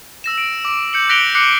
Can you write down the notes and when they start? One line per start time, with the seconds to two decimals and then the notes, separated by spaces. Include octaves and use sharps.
0.24 E6 A#6 E7
0.38 D7
0.65 D6
0.93 G6 C#7 F#7
1.09 F#6 A#6 B6 D7 F7 G7
1.35 D6 F#6 C7 C#7 F#7